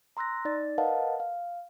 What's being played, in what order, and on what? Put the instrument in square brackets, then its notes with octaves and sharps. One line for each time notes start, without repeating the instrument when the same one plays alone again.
[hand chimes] A#5 C6 E6 F#6 A#6
D#4 D5 A6
A#4 B4 D#5 F5 F#5 A5
F5